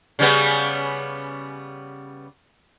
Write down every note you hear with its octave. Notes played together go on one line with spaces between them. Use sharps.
C#3 G3 B3